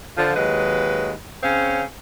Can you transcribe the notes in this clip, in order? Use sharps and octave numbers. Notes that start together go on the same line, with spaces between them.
D3 F3
D#2 F#3 G#3 B4
C#3 C4 C#4 F5